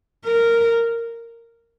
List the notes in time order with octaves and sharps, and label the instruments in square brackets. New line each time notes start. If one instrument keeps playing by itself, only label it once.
[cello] A#4